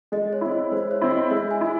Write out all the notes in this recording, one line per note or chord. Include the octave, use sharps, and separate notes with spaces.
G#3 D#5
C#5
C4 E4
C#5
G#3 C5
C#5
C4 E4
D#5
G#3 E5
G#5
E4